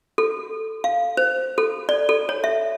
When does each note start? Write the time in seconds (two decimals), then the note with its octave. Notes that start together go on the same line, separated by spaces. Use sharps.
0.18 A4
0.84 F5
1.17 C5
1.58 A4
1.89 D5
2.09 A4
2.29 C#5
2.44 E5